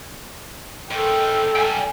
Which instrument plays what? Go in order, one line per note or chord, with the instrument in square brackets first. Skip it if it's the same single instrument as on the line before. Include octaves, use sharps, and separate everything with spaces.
[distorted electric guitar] G#2 D#3 [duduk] A4 [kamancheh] G5
[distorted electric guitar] F#2 G3 [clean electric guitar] G5 G#5